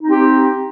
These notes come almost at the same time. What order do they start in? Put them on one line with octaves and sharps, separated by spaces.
D#4 C4 G4